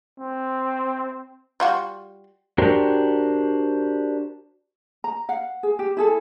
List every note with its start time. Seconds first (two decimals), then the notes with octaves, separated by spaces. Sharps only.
0.19 C4
1.60 G3 F4 F#4
2.58 D4 F#4 G4 A#4 C5
5.04 A#5
5.29 F5 F#5
5.63 G#4
5.79 G4
5.97 E4 G#4 A4